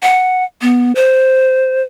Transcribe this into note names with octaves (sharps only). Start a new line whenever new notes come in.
F#5
B3
C5